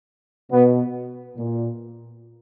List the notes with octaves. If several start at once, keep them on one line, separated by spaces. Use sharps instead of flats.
B2 B3
A#2